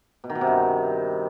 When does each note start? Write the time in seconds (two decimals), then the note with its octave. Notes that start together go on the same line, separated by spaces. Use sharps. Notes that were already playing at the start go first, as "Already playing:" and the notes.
0.24 B2
0.30 D#3
0.35 B2
0.41 C3
0.47 G2